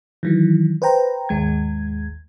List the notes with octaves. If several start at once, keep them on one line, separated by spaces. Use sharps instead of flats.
D#3 E3 F#3
B4 C5 G5 A#5
G#1 D#2 G#3 G#6